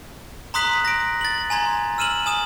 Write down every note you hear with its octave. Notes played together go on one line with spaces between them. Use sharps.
A#5 C6 D#6 F#6 B6 F#7
A#6 D7
A6 F#7
G#5 A#5 C6 G#6
E6 F6 D#7 E7 F#7
G#5 D#6 E7 F#7